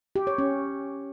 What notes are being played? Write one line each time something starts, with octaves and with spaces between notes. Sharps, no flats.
G4
C#5
C#4